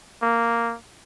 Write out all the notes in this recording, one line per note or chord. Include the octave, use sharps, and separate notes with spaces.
A#3